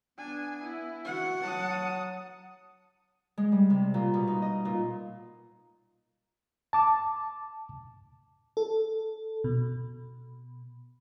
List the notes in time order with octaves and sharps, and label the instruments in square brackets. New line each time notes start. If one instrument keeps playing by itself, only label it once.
[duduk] B3 [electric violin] D4 G#5
[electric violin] E4
[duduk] F#4 [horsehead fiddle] F#5
[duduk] F#3 [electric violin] A5 D#6
[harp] G#3
G3
C3
A#2
B2
D#4
D#5
A#2
[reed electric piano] A5 D6
[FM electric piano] A4
B2